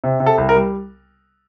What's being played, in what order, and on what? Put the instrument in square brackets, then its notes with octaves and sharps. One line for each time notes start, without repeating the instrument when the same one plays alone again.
[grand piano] C3
C3
A4
C2
A#4
G3